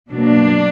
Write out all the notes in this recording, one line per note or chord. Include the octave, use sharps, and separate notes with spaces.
B2 F#3 A#3 D4